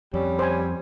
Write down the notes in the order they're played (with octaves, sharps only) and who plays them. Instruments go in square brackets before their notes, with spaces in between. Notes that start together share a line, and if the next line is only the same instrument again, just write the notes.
[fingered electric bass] F2 [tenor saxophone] G3 [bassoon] C#4
[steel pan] C5 G#5